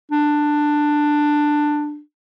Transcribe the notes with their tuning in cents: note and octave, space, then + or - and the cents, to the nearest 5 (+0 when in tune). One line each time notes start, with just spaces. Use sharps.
D4 +10